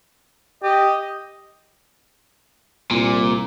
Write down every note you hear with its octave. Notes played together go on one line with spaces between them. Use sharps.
G4 D#5
C2 A#2